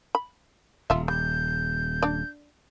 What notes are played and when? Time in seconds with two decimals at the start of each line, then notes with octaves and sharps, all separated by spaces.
0.15 B5
0.90 D#1 F4 E5
1.08 G3 G6
2.02 D4 D5